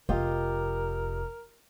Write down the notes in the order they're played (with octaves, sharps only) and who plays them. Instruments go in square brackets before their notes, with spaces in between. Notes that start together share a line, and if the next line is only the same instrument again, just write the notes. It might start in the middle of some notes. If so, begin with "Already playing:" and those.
[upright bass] F1 [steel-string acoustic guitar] F4 G4 D#5 [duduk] A#4